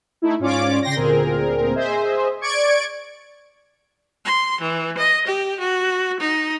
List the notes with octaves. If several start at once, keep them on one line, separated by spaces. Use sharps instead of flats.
A3 D#4 E4
G#2 C#4 F4 C#5 D5 D6
C#3 G5 C6 A#6
D2 A#2 C4 G#4 A#4
G#4 C5 D#5 E5
D5 C#6 G#6 D7
C6
E3
D#5
G4
F#4
D#4